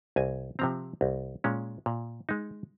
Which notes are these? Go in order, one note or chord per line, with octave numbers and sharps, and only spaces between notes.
C2 G#5
C3 F3 C4 A#5
C2
A#2 G#3 C#4
A#2
G#3 D#4